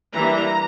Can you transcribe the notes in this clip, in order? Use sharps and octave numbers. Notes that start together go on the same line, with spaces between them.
E3 G3 A#3 D4 A#5